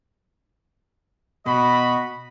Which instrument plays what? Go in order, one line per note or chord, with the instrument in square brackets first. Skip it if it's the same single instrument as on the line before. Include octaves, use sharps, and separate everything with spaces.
[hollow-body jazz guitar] B2 [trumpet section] F#4 D#5 B5